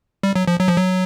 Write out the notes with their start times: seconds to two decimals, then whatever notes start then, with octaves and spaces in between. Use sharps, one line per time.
0.23 G3
0.36 F#3
0.48 F3
0.60 F#3
0.68 F3
0.77 F#3